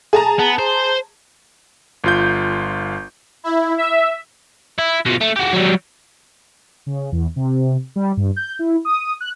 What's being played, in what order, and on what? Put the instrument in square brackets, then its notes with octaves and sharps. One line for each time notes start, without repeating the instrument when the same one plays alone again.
[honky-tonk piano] G#4 A5 A#5
[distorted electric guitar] B3
C5
[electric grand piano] G1 F4 G6
[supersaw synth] E4
E5
[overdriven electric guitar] E4
B2 F3
A3
F#4 G4
F#3 G3
[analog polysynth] C#3
E2
C3
G3
G2
G6
E4
D#6
F#6